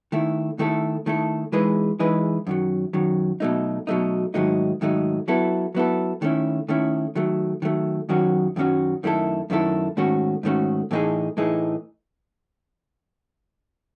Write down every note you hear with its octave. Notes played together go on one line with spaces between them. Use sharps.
D#3 A3 E4
D#3 A3 E4 A4
D#3 A3 E4 A4
E3 G#3 D#4 G#4 B4
E3 G#3 D#4 G#4 B4
F#2 D#3 F#3
F#2 D#3 F#3
B2 F#3 A3 D#4
B2 F#3 A3 D#4
G#2 D#3 F#3 A3 D#4
G#2 D#3 F#3 A3 D#4
F#3 B3 E4 A4
F#3 B3 E4 A4
D#3 A3 C#4 E4
D#3 A3 C#4 E4
D#3 F#3 A3
D#3 F#3 A3
F#2 D#3 F#3 C#4 F#4
F#2 D#3 F#3 C#4 F#4
F#2 D#3 A3 E4 A4
F#2 D#3 A3 E4 A4
G#2 D#3 A3 C#4 F#4
G#2 D#3 A3 C#4 F#4
A2 E3 A3 D#4 G#4
A2 E3 A3 D#4 G#4